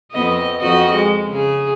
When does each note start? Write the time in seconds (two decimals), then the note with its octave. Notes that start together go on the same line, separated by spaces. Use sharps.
0.12 F2 B3 D#5
0.60 F2 F#4 D#5
0.95 G#3
1.30 C#3 G#4